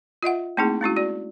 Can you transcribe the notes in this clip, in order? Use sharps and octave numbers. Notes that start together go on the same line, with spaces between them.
F4 D#5 E5 F#5
A3 A#3 C4 D#4 E4 G#4
G#3 C#4 E4 F#4
F#4 D5